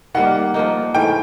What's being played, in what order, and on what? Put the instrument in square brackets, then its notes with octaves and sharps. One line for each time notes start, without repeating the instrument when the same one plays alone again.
[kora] D#3 G3 A#3 [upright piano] F#5
[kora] F3 A#3 D#4
[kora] G#2 E3 A3 [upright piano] G5